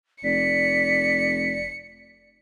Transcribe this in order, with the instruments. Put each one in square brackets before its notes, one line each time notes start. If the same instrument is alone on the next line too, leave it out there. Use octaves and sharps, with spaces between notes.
[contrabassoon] F1 [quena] D5 [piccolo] B6 [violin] C#7